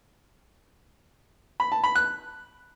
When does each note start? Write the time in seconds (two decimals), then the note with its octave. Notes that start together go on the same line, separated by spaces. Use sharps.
1.60 B5
1.72 A5
1.84 B5
1.95 F#6